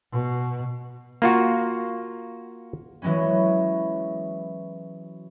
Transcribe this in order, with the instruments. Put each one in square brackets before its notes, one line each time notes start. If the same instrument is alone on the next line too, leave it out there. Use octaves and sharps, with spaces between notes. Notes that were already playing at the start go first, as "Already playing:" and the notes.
[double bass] B2
[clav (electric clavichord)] A#3 F4 F#4
[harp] E3 F#3 G#3 B3 C#4